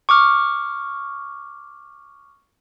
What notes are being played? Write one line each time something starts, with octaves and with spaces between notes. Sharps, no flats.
C#6 D6 F6